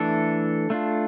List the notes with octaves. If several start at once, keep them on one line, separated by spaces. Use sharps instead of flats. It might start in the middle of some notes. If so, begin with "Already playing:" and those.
Already playing: E3 A3 D4 A4
A3 D4 F4